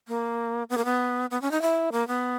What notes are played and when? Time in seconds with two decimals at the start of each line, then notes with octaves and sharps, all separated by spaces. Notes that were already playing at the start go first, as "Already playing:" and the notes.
0.08 A#3
0.69 B3
0.77 A#3
0.85 B3
1.31 B3
1.41 C#4
1.51 D#4
1.62 E4
1.92 A#3
2.07 B3